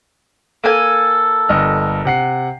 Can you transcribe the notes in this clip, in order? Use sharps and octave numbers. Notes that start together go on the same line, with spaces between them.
A#3 A4 G#5
G1 D#5 F6
C3 F#5 C7